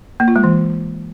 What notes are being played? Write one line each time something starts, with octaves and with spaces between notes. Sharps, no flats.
A#3
F4
G#3
E3